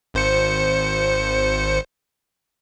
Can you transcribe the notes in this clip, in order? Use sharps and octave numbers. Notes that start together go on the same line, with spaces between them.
G#1 C5 C#7